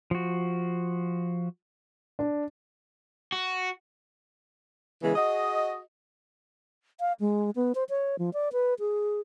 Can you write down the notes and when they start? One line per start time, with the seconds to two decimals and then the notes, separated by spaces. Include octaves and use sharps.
0.11 F3 F#4
2.19 D4
3.32 F#4
5.03 C#3 E3 G#3 B3
5.16 F#4 G#4 D#5
7.00 F5
7.20 G#3
7.56 B3
7.75 C5
7.89 C#5
8.19 F3
8.33 D5
8.53 B4
8.79 G#4